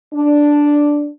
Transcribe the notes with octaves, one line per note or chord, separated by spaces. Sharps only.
D4